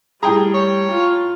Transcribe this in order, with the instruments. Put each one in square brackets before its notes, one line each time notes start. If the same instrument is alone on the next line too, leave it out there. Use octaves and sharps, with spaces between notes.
[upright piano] A2 G5 A#5 [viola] G3 [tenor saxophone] G#4
[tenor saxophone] C#5
[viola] F4